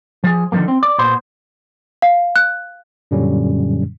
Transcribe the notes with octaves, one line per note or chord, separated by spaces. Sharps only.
F3 G#4
D3 D#3 F3 F#3 A#3
C4
D5
A#2 B3 C5
F5
F#6
F#2 A#2 D3 F#3 G3 C#4